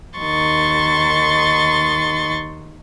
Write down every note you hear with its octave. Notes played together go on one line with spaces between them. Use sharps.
D#2 D#3 C6 C#6 A6